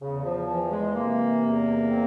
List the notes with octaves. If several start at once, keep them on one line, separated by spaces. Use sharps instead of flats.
E2 C#3
F3
E3 F3
G#3
C3 A#3
E2
C4